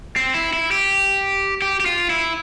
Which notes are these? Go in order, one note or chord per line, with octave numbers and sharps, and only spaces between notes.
C4
E4
E4
G4
G4
G4
F4
E4